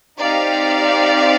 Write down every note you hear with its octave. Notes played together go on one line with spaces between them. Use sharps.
C4 D#4 G4 D5 F5